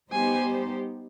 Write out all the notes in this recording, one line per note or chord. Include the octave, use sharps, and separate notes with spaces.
G3 B3 D#4 G4 C5 G#5